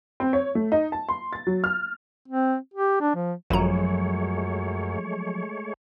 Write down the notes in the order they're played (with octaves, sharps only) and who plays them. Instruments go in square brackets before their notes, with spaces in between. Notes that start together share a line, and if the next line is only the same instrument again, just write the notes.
[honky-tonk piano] C4
C#5
A3
D#4
A5
C6
A6
F#3
F6
[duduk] C4
G4
D4
F3
[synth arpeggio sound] G#1 A#5 [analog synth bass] F#2 [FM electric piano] F3 F#3 [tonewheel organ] G#3 A3 C#5